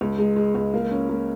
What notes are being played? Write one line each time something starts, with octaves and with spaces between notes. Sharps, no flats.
C#2
G#3
G#3
C#2
A#3
C#4
A#3